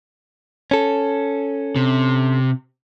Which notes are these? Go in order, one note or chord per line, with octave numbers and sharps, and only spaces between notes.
C#4 A4
C3